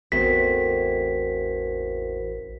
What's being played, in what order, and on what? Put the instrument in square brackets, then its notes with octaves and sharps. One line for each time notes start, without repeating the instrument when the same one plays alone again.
[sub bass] A1 [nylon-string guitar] E2 A3 C4 [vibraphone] F#4 A#4 C5 [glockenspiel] B6